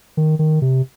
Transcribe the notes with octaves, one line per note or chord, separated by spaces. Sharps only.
D#3
D#3
C3